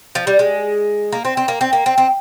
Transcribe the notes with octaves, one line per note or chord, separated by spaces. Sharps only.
F3
G3
G#3
A#3
C4
C4
A#3
C4
A#3
C4
C4